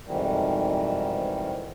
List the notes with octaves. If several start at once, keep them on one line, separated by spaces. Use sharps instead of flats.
F2 G#2 B2 D#3 E3 G3